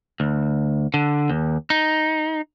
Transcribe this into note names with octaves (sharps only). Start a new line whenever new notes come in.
D2
D3
D#2
D#4